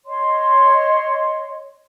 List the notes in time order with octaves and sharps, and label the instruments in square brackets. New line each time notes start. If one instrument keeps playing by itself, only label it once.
[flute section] C#5 D#5 C6